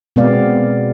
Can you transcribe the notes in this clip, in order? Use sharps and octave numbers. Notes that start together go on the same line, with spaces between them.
B2 G#3 B3 C4 D5 F5